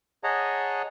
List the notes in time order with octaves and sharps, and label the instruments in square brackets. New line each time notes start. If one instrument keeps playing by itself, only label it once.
[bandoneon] G#4 C#5 D#5 F#5 A5 A#5